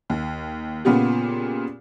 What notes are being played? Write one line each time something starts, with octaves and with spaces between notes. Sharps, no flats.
D#2
A#2 C#3 B3 F4 G4